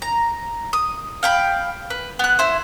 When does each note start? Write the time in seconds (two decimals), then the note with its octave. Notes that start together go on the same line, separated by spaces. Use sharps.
0.02 A#5
0.73 D#6
1.23 F5 G5 B5
1.90 B4
2.19 B3 F#6
2.39 E4 C5